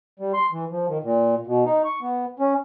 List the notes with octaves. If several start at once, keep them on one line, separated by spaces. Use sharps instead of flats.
G3
C6
E3
F3
D#3
A#2
B2
D#4
C#6
B3
C#4